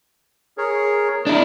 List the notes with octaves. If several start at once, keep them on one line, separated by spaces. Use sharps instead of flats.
G#4 A#4 C#5
G#3 D4 E4